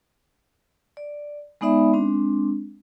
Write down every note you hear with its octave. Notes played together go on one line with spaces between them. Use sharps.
D5
G#3 B3 D#4 D5 E5 B5
G#3 C4 D4